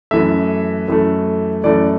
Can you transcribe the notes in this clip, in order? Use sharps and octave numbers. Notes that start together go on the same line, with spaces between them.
F#2 E3 A3 E5
F#2 E3 A3
F#2 E3 A3 D5